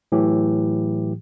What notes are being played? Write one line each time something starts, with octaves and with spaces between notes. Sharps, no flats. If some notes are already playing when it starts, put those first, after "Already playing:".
A2 E3 F#3 G4